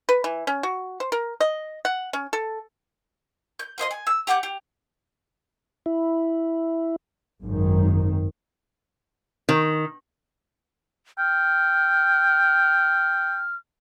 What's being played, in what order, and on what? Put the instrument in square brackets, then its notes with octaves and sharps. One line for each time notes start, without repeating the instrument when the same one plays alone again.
[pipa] B4
E3
C#4
F#4
C5
A#4
D#5
F#5
C#4
A4
[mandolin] G6
F4 C5 D#5 C6
G#5
E6
G4 F#5 D6 G6
G4
[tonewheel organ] E4
[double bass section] G#1 F#2 D#3
[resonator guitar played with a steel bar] D#3
[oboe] G5 [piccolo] F6